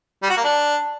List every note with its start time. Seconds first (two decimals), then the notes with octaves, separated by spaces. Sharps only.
0.23 G3
0.30 F#4
0.37 A#3
0.44 D4